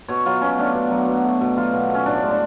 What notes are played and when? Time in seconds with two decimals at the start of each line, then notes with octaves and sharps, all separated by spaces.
0.08 B2 C#5
0.26 F#3 F4
0.42 B2 C#4
0.58 A3 D4
0.75 B2
0.91 F#3
1.08 B2
1.24 A3
1.41 B2
1.57 F#3 F4
1.73 B2
1.90 A3 C#4
2.06 A2 D4
2.22 G#3
2.31 D4